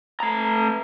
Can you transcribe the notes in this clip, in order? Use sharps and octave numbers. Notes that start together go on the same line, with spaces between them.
A3 A#5